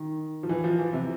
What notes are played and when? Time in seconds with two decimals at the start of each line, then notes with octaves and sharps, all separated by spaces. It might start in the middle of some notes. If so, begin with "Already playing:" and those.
Already playing: D#3
0.43 F3
0.49 E3
0.64 F3
0.78 E3
0.93 C3